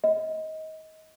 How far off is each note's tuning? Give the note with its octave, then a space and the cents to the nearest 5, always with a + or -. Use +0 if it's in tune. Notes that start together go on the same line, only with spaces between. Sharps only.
D#5 +25